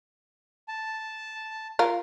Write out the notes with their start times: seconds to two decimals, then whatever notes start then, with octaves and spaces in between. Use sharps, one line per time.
0.68 A5
1.79 F4 A#4